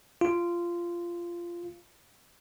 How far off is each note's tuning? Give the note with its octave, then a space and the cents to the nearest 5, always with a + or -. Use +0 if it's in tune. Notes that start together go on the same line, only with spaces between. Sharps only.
F4 -15